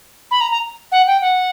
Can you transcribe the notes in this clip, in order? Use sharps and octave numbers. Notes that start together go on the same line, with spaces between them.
B5
A#5
A#5
F#5
G5
F#5